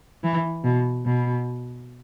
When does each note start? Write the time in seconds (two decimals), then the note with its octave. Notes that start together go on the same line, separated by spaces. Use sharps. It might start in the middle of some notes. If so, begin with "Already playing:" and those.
0.24 E3
0.64 B2
1.06 B2